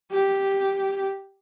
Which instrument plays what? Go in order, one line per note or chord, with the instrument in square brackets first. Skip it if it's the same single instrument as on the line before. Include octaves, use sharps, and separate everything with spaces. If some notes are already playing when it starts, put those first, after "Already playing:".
[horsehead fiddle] G4